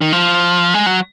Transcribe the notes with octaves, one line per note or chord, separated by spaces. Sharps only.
D#3
F3
G#3
F#3